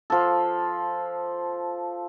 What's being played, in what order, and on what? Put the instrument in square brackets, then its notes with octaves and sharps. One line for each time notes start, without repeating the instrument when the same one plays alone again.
[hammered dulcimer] F3 A4